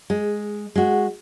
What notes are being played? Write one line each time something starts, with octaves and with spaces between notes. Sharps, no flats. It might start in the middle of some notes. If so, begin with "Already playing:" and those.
G#3
G#3 F#4